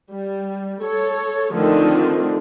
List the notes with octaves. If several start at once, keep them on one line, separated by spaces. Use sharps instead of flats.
G3
A4 C#5
D3 D#3 F3 A3 C4 D4